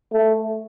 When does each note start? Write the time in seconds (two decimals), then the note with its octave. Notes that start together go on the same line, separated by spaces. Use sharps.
0.13 A3